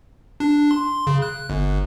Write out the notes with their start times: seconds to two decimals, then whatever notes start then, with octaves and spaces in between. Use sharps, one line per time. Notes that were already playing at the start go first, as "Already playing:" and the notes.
0.40 D4
0.71 C6
1.07 C#3
1.22 F#6
1.50 G1